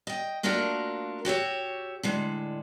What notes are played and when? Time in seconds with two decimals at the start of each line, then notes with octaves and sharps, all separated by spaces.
0.07 D#5 G5
0.43 A3 A#3 D4 F4 F#4 A#4
1.25 F#4 G4 C#5 E5
2.03 A2 D3 G#3